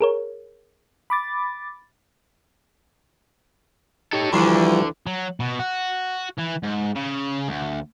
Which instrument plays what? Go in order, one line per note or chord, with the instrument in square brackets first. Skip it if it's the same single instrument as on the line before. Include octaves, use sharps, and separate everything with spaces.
[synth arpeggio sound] G#4 A#4 C#5
[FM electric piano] B5 D6 A6
[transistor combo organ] D#4 G4 [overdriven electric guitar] A4 C#5
[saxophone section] D2 E3 [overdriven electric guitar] D3 [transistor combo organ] F3 G3
[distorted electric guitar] F#3
B2
F#4
E3
G#2
C#3
D2